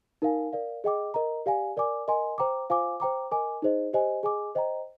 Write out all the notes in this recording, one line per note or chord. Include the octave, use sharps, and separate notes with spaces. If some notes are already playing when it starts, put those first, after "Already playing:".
D#4 A#4 F5 G#5
A#4 D5 F5
G#4 D#5 G5 D6
A#4 D#5 A#5
G4 D5 F5 G#5
A#4 D5 G#5 D6
A#4 D#5 G#5 C6
C5 G5 A#5 D6
F4 C5 F5 G#5 D6
C5 G5 A#5 D6
A#4 D#5 G#5 D6
D#4 G#4 C5 D#5
G4 C5 D#5 G#5
G#4 D#5 G#5 D6
C5 D#5 G5 A#5